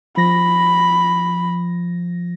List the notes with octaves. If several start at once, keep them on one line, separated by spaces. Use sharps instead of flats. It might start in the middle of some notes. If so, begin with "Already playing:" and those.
F3 B5 A#6